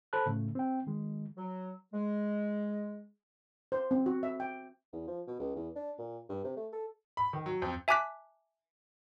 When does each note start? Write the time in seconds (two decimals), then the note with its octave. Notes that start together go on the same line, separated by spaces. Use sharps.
0.13 A4 C5 A5 B5 F#6
0.26 A2 C#3 A3
0.55 C4 G5
0.87 D#3 G#3
1.37 F#3
1.93 G#3
3.72 C5
3.91 C4
4.06 F#4
4.23 E5
4.40 G5
4.93 E2
5.07 F3
5.27 B2
5.40 C#2
5.55 E2
5.75 D4
5.98 A#2
6.29 G2
6.44 C3
6.57 A3
6.73 A4
7.17 B5
7.33 D#3
7.46 F#3
7.62 F2
7.88 E5 G#5 A5 D6 F#6 B6